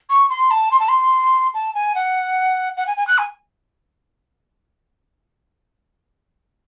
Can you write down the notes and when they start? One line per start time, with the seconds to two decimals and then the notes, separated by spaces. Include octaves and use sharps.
0.10 C#6
0.30 C6
0.51 A5
0.71 C6
0.79 A5
0.89 C6
1.54 A5
1.74 G#5
1.95 F#5
2.77 F#5
2.87 G#5
2.97 G#5
3.07 F#6
3.18 G#5